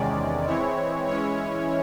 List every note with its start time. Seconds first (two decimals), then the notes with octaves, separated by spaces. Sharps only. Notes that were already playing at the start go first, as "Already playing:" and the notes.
Already playing: E2 C3 D#3 G#3 C#4 D5
0.46 E3 G#3 C4 E4 C#5
1.07 E3 G#3 C#4 E4 C#5